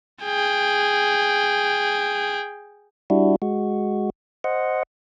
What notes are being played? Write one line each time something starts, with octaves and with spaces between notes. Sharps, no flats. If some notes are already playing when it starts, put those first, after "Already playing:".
G#4 G5
G3 D4 E4 F#4
G#3 F#4
C5 D#5 F#5